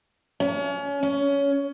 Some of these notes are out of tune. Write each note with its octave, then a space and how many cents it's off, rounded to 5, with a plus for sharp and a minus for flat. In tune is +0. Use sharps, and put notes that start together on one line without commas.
C#4 +30
C#4 +20